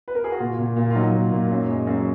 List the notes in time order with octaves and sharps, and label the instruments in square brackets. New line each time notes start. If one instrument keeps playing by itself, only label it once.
[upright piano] B4
A#4
G#4
F#4
A#2 F4
A#2
A#2
F4
F#3 D#4
A#2
A#2
F#2
G#3
F#2